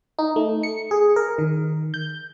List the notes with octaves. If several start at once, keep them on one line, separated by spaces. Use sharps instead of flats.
D#4
A3
C#7
G#4
A#4
D#3
G6